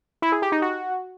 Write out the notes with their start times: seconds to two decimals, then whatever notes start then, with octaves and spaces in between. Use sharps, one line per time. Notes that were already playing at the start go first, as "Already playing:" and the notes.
0.22 E4
0.32 G#4
0.42 G4
0.52 D#4
0.62 F#4